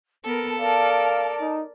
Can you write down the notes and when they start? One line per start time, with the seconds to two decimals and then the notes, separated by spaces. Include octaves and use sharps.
0.25 B3 A4 A#4 A5
0.59 A#4 D5 F5
1.41 D#4